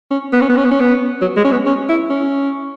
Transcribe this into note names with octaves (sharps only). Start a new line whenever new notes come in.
C#4
B3
C#4
B3
C#4
B3
C#4
B3
F#3
G#3
C#4
B3
C#4
E4
C#4